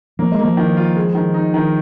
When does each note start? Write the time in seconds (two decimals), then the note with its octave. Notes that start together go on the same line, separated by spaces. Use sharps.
0.19 F3 A#3
0.32 G#3
0.39 A#3
0.45 F3
0.57 D#3
0.77 F4
0.96 G#3
1.15 D#3
1.34 D#4
1.54 D#3